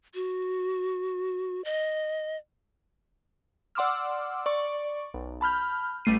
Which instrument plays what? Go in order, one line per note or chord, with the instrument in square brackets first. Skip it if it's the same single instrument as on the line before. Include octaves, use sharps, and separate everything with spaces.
[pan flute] F#4
D#5
[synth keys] D5 F#5 C6 D6 E6 F6
D5 C#6
B1
A5 B5 F6 G6
A1 G3 A3 C7 D#7